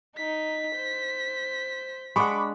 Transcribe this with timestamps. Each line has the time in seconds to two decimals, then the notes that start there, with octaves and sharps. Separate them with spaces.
0.17 D#4 B6
0.76 C5
2.16 G#3 D4 F#5 B5 C#6 D6